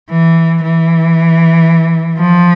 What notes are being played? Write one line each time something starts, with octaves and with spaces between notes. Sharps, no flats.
E3
E3
F3